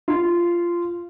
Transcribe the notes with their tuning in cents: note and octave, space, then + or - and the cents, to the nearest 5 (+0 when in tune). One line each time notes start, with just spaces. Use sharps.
F4 -15